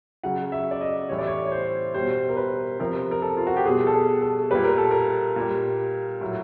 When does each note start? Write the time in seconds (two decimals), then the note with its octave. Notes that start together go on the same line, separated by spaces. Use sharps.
0.23 C#3 F#3 F#5
0.52 E5
0.71 D5
0.81 D#5
1.09 A2 E3 G3 C#5
1.18 D5
1.27 C#5
1.47 C#5
1.52 C5
1.94 B2 G3 C5
2.29 A#4
2.37 B4
2.80 C3 F3 A#4
3.11 A#4
3.22 A4
3.37 F4
3.47 F#4
3.56 G4
3.65 B2 G3 G#4
3.87 A4
3.94 G#4
4.22 A4
4.51 A#2 G3 B4
4.64 A#4
4.78 A4
4.91 A#4
5.36 A#2 G3
6.21 A2 F#3